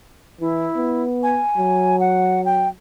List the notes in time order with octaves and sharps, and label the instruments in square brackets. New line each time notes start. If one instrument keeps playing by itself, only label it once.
[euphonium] E3 [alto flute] E4
[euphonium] B3
[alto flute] G#5
[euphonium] F#3
[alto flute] F#5
G5